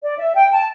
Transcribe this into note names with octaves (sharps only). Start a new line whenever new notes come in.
D5
E5
G5
A5